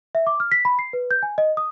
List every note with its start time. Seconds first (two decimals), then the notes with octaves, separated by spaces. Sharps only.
0.15 E5
0.27 D6
0.40 F6
0.52 B6
0.65 B5
0.79 C7
0.93 B4
1.11 G6
1.23 G#5
1.38 D#5
1.57 D#6